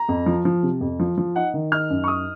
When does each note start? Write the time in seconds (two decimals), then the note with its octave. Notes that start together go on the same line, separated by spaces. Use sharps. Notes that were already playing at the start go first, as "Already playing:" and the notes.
Already playing: A#5
0.09 F2
0.26 F3
0.45 F3
0.63 C3
0.81 F2
0.99 F3
1.18 F3
1.36 D#4 F#5
1.54 D#3
1.72 D#4 F6
1.90 F#2
2.04 C#6
2.08 D#4 D#6